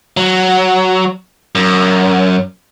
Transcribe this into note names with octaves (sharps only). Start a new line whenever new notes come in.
F#3
F#2